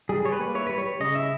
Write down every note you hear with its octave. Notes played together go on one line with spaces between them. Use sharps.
G3 G#4
G3 C#5
B4
A#3
E4 C#5
G3 B4
C#5
G3
C#3 D#5
E4 E5